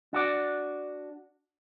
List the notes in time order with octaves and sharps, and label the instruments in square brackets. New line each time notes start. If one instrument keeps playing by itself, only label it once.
[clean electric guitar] D4 F#4 D5